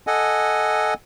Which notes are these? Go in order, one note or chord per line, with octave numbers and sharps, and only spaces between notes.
A4 D#5 F#5 G#5